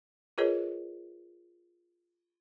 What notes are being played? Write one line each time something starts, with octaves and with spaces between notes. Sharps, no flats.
F4 G#4 A#4 B4 C#5 D#5